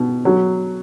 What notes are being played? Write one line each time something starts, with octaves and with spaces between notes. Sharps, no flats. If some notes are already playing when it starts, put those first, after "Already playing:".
Already playing: B2
F#3